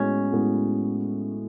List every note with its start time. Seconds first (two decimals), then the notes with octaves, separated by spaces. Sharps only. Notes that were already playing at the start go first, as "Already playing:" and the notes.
Already playing: A2 G#3 B3 C#4 F#4
0.32 A2 G#3 B3 F#4